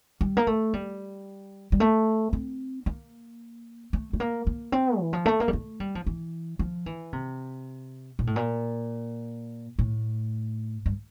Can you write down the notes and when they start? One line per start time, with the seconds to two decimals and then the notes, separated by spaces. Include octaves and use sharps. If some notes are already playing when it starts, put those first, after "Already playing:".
0.21 G3
0.37 A#3
0.47 A3
0.74 G3
1.72 G3
1.80 A3
2.33 C4
2.86 A#3
3.93 A3
4.13 A3
4.20 A#3
4.47 A#3
4.72 C4
4.99 E3
5.13 F3
5.26 A3
5.40 A#3
5.48 G3
5.53 A3
5.80 G3
5.95 F3
6.06 E3
6.59 F3
6.86 E3
7.13 C3
8.19 A#2
8.27 A2
8.36 A#2
9.79 A2
10.86 G2